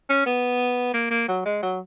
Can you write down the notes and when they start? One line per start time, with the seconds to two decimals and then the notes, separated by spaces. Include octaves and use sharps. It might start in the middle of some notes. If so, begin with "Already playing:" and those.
0.10 C#4
0.26 B3
0.94 A#3
1.11 A#3
1.29 F#3
1.46 G#3
1.63 F#3